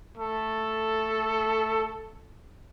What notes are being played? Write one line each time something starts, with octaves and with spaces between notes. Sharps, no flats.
A3 A4